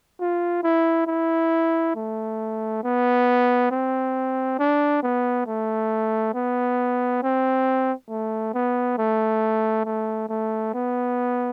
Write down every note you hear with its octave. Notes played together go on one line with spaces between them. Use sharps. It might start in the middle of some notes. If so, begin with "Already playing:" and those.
F4
E4
E4
A3
B3
C4
D4
B3
A3
B3
C4
A3
B3
A3
A3
A3
B3